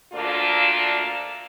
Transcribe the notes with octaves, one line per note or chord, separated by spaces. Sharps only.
D2 A#2 A#3 D4 F4